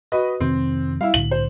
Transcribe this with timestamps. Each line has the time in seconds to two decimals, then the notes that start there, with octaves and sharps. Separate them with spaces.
0.12 F#4 B4 D#5
0.40 F2 C3 D#3 C4
1.01 G3 E4 F5
1.14 C2 A2 D3 F#7
1.31 C5